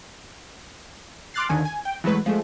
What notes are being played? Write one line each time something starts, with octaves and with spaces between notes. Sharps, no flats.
C6 D6 F6 F#6 A6 C7
D#2 D3 D#3 G#5
G#5
G5
E3 F#3 G#3 A3 B4
F3 G#3 A3